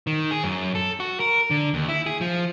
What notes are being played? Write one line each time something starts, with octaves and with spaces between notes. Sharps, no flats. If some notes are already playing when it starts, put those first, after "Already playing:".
D#3
G#4
F#2
A4
F#4
A#4
D3
D#2
E4
G#4
F3